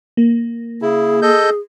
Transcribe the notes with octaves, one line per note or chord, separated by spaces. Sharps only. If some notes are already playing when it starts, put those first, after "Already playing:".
A#3
C#3 E4 G#4
A4 D#5 G6